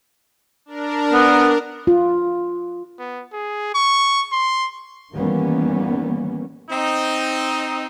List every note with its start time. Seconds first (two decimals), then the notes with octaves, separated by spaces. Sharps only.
0.66 D4 A#4
1.13 B3
1.87 F4
2.99 B3
3.33 G#4
3.75 C#6
4.32 C6
5.14 D#3 E3 G3 A#3 B3 C#4
6.70 C4 D#4